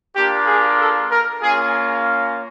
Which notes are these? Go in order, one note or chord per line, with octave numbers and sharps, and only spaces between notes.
A#3 D4 F4 G4
G#4
A4
A#4
A#3 C#4 F4 G#4